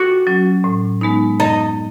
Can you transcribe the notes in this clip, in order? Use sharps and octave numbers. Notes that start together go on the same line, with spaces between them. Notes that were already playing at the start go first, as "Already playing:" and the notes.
Already playing: F#4
F#3 C#4
A2
G#3 B3 D#4
F#2 D#4